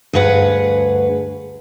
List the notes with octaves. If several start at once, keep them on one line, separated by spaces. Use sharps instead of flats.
D2 G2 G#4 B4 F#5